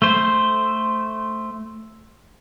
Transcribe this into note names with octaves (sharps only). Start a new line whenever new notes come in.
A3 C5